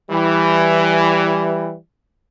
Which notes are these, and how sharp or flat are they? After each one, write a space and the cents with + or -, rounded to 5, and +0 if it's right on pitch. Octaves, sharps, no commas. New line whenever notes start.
E3 +10 G3 +5